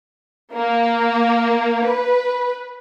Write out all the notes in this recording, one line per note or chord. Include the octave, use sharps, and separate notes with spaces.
A#3
B4